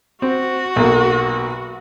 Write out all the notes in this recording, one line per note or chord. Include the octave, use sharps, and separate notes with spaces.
C4 F#4
B1 A#3